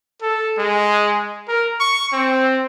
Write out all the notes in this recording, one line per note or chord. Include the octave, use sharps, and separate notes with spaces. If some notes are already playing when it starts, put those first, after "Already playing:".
A4
G#3
A#4
C#6
C4